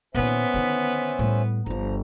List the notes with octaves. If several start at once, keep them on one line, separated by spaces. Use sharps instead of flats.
A#2 D#3 B3 C#4 C5 E5
D3 D#3
A2 G3
G1 G2 F3 A#5